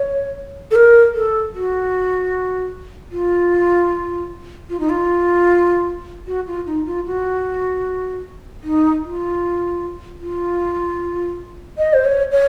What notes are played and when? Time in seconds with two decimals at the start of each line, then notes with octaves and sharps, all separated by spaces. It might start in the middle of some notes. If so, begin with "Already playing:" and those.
Already playing: C#5
0.71 A4
0.75 A#4
1.14 A4
1.54 F#4
3.11 F4
4.69 F4
4.79 D#4
4.89 F4
6.27 F#4
6.47 F4
6.66 D#4
6.86 F4
7.06 F#4
8.63 D#4
9.03 F4
10.21 F4
11.78 D#5
11.93 C5
12.05 C#5
12.31 C#5